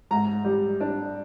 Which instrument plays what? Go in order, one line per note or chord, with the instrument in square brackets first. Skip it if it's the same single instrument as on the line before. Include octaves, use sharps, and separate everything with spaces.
[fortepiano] G#2 A#5
G3
D4